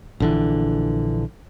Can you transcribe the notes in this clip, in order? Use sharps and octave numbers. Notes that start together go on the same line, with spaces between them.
A#1 D3 E3